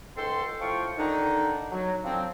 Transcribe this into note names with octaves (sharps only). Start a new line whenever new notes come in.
C#2 G#2 A4 G5 C6
A2 F3 F4 F5 G5 C#6
D3 D#3 D4 D#4
F#3
D3 F3 F#3 C4